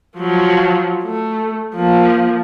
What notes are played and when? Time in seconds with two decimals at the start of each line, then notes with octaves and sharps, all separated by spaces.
0.17 F3 F#3
1.05 A3
1.76 F3 A#3